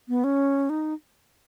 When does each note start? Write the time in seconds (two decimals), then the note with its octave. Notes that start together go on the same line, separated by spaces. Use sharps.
0.08 B3
0.24 C#4
0.70 D#4